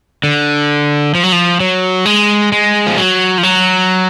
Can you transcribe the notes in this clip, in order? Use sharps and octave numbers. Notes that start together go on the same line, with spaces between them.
D3
F3
F#3
F3
F#3
G#3
G#3
F3
F#3
F3
F#3